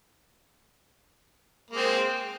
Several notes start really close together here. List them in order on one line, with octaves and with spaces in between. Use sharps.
A#3 G#3 C4